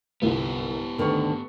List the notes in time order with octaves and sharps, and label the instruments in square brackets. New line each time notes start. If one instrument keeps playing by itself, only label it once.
[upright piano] G1 C2 [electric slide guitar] B3 G4
[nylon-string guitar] D2 D3 D#3 [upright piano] A4 B4 C#6